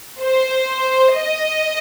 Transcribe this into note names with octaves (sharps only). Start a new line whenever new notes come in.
C5
D#5